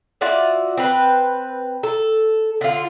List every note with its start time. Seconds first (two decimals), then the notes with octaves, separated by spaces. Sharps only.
0.21 F4 F#4 D5 E5
0.77 C4 B4
1.83 A4
2.61 D3 F4